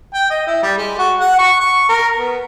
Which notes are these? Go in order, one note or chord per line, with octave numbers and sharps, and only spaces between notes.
G5
D#5
E4
G3
G#3
F#4
F#5
C#6
C#6
A#4
B3